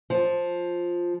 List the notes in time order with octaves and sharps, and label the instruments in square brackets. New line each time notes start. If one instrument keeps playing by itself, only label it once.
[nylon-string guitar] F3